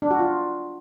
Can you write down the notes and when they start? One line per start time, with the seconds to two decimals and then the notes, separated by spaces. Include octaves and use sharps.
0.02 D4
0.11 F#4
0.19 F4